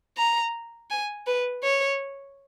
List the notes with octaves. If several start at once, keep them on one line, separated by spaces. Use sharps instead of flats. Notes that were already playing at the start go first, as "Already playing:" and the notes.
A#5
G#5
B4
C#5